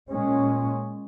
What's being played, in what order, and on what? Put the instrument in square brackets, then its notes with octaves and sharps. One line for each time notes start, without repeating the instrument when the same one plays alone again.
[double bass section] A#2 G#3 C#4